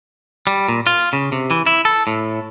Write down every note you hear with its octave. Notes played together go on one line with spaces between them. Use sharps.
G3
A#2
F4
C#3
C3
E3
E4
A4
A2